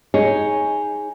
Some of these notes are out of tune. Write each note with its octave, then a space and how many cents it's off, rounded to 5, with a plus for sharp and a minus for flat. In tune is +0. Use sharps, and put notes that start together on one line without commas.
D#4 +15 G#4 +0 C#5 +0